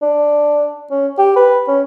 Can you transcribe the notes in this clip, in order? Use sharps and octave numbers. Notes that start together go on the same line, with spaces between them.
D4
C#4
G4
B4
C#4